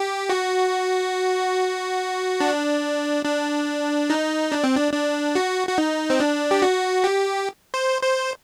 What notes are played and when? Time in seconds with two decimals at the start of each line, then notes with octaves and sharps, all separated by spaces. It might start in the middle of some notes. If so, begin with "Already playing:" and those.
Already playing: G4
0.30 F#4
2.40 D4
3.25 D4
4.10 D#4
4.52 D4
4.64 C4
4.77 D4
4.93 D4
5.35 F#4
5.68 F#4
5.78 D#4
6.10 C4
6.20 D4
6.51 G4
6.62 F#4
7.04 G4
7.74 C5
8.02 C5